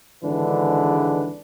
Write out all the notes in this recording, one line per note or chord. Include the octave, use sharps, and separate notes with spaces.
G#1 D3 E3 G#3 D4 B4